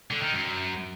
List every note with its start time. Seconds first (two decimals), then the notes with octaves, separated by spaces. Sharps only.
0.11 D3
0.22 D#3
0.33 F#2